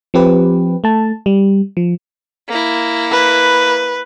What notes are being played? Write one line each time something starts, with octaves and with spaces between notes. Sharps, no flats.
F3 C4 G4 B4
A3 A5
G3
F3
A#3 E4
B4